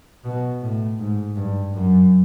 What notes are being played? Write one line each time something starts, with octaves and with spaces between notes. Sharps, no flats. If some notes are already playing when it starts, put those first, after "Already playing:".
B2
A2
G#2
G2
F#2